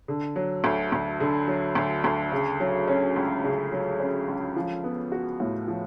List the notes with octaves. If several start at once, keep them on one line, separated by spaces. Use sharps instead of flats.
D3
F#3
D2
D2
D3
F#3
D2
D2
C#3
F#3
C#4
C#2
C#3
F#3
C#4
C#2
F3
B3
F#4
A2
F3